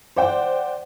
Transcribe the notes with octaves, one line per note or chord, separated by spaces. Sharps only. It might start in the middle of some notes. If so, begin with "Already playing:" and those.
C5 D5 F#5 G5